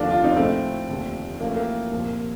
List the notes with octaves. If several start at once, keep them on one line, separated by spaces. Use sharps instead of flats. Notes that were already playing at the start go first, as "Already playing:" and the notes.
Already playing: F1 D#2 D3 F3 D4 F4
D4 F4
C4 D#4
A#1 A2 F3 A3 C4
F1 D#2 D3 F3
A1 A2 F3 A#3
A3
A#3
C2 A#2 F3